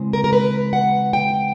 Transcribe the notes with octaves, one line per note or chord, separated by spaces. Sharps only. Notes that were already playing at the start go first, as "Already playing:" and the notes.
Already playing: C#3 E3 G#3 C4
A#4
A#4
B4
F#5
G5